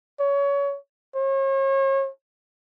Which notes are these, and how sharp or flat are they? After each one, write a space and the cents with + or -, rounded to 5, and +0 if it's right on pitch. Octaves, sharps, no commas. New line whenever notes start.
C#5 +25
C#5 -40